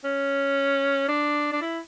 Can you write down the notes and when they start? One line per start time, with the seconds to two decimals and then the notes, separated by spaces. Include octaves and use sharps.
0.04 C#4
1.08 D4
1.52 D4
1.61 E4